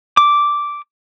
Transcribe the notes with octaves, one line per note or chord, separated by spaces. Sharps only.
D6